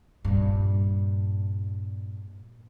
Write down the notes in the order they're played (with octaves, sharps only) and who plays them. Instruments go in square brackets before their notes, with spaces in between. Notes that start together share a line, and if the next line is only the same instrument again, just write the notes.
[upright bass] G2 A#2